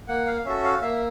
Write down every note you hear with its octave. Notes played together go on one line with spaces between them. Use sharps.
A#3 F#5
F5
C#4 F#4 A4 E5
F5
A#3 E5